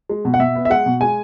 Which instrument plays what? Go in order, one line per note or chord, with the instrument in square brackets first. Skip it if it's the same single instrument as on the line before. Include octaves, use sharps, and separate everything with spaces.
[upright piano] G#3
B2
F#5
B2 E5
B3
E5
G#3 F#5
B2
G#3 G#5